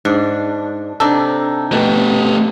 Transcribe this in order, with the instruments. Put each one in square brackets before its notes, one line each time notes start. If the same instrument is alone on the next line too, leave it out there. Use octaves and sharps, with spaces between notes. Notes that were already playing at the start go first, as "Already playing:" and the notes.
[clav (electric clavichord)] G#2 [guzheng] D4
[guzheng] C3 D4 D#4 [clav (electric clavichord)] A4
[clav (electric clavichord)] B2 [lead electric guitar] A3 G4